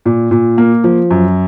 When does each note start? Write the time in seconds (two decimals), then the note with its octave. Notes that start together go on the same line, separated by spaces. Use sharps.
0.06 A#2
0.31 A#2
0.58 A#3
0.84 F3
1.11 F#2